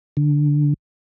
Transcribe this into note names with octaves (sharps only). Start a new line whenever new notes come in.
D3